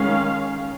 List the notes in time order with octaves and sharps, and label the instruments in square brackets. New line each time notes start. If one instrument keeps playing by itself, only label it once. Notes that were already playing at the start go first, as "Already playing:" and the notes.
Already playing: [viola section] D#3 G#3 C#4 F5